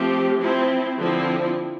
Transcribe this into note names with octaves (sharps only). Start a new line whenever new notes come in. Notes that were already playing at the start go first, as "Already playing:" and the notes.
Already playing: F3 A3 C4 G4
F3 C4 E4
D3 F3 C4 E4